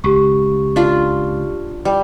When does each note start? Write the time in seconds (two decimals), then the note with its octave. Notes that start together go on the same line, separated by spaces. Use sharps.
0.04 C#2 G4 C#6
0.76 D4 F4
1.85 G3